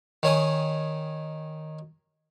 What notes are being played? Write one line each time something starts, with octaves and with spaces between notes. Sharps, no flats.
D#3 C#5 G#5 D#6